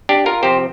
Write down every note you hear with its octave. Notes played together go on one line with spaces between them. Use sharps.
D4 G4
F4 A#4
C3 F3 C4 G4 C5